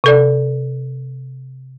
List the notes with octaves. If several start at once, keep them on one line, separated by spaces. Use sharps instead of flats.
C3 A4 D5